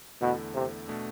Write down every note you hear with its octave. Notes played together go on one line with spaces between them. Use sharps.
E2 B2 D3 A3 E4 A4
C3
B2 A3 D4